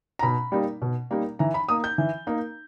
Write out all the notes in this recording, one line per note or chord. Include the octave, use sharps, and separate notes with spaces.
A#5
B2 B5
G3 A#3 D#4
B2
G3 A#3 D#4
E3 A#5
B5
A#3 D#4 D#6
G6
E3
A#3 D#4